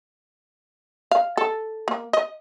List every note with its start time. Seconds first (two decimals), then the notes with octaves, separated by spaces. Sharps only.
1.11 F5
1.37 A4
1.88 A#3
2.13 D#5